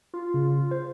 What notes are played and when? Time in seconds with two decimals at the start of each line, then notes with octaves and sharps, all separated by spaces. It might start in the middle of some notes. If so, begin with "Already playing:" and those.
0.14 F4
0.34 C#3
0.71 C5